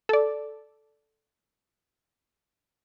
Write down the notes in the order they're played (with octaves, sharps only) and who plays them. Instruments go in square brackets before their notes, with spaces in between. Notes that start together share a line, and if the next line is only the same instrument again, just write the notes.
[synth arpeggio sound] A4 D5